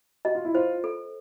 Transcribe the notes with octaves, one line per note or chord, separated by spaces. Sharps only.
F#4 D#5
F4
E4
F4 C5
A4